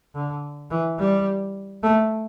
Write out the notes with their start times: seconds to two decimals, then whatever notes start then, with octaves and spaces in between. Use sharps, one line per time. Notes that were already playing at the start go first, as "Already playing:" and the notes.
0.15 D3
0.71 E3
0.99 G3
1.83 A3